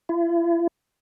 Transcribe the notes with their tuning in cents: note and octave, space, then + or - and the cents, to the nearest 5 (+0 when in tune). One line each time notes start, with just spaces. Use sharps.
E4 +45